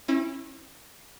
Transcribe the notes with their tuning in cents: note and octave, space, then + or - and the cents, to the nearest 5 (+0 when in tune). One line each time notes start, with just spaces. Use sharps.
C#4 -35 E4 +0